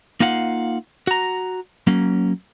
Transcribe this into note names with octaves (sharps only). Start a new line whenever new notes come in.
A#3 D#4 F4 F5 F#5
F#4 A#5
F#3 A#3 C#4